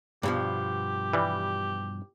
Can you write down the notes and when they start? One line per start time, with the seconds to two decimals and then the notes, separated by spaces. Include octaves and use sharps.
0.23 G2 B2 F3 G4
1.13 E3 G3